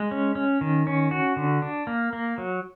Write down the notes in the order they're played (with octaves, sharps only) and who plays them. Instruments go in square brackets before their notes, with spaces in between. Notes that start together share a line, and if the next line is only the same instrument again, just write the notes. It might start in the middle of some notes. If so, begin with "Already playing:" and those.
Already playing: [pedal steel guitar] G#3
C#4
C#4
D#3
C#4
F#4
D3
D4
A#3
A#3
F#3